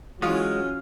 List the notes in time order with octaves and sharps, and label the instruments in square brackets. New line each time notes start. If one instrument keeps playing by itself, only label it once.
[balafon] E3 E4 [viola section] F#3 C#4 [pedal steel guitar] G#3 [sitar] F4